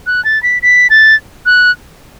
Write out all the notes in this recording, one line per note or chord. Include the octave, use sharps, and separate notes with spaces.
F#6
A6
B6
B6
A6
F#6